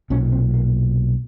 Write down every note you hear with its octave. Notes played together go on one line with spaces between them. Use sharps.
B1 A#2 C#4
C4
A#3